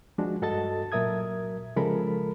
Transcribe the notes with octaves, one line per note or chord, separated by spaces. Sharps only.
F3 G#3 D4 F#4
G2 F#4 A4 D#5 A5 A6
A#2 F#3 A#4 E5 D#6 G#6
C#3 F3 G#3 A4 A#4 B5